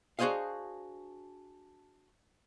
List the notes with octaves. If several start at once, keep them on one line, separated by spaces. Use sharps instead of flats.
D4 F#4 G#4 C5 D#5 F5